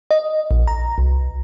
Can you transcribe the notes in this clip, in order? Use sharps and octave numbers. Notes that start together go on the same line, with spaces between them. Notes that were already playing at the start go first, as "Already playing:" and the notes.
D#5
A#1
A#5
C2